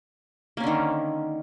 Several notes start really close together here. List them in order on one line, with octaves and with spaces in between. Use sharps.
A#3 C#4 D3 D#3